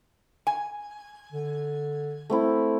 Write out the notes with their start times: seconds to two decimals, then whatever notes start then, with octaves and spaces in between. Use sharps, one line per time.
0.47 G#5
1.32 D3
2.30 A3 C4 E4